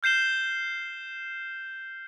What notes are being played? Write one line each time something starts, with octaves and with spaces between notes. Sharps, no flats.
F6 G6 C7 E7 G7